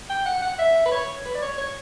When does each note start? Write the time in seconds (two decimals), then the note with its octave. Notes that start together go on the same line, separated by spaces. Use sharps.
0.10 G5
0.26 F#5
0.42 F#5
0.58 E5
0.86 B4
0.92 C#5
1.25 B4
1.35 D5
1.42 C#5
1.58 C#5